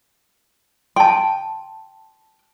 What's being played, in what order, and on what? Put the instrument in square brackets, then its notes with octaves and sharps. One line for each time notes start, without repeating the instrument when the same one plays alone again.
[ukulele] G5 [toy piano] A5 C6